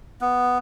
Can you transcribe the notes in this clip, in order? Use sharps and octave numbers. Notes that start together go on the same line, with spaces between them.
B3